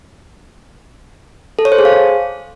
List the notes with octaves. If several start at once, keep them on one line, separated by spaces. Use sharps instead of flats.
A4
C#5
C5
G#4
F5